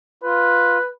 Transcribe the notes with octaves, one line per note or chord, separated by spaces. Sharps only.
F4 B4